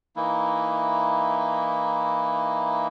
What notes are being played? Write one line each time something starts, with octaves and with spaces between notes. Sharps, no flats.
E3 A#3 D#4 E4